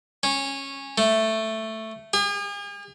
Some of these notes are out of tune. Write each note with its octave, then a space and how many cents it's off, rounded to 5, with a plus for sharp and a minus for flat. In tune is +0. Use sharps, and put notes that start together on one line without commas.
C#4 -15
A3 +5
G#4 -45